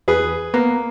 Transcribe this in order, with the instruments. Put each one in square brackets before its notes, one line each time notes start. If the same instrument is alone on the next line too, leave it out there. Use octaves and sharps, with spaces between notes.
[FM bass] E2 [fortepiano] G#4 B4
[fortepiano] A#3 [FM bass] B3